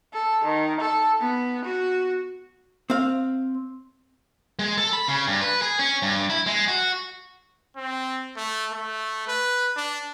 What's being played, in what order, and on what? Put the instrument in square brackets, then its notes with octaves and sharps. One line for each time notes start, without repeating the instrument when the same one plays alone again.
[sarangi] A4
D#3
A4
B3
F#4
[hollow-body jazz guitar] C4 F5
[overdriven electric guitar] G#3
A4
B5
C#3
G2
B4
G#4
C#4
G2
E4
G#3
F#4
[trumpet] C4
A3
A3
B4
D4